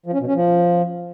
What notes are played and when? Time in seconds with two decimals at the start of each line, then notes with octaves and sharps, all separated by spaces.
0.06 F3
0.13 C#4
0.20 B2
0.28 C#4
0.35 F3